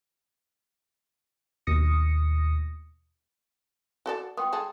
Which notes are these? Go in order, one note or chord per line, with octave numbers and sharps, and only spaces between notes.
D#2 B2 D#6 A#6 C#7
F#4 A4 D5
B3 G5 C6 D#6
G#3 G#4 A4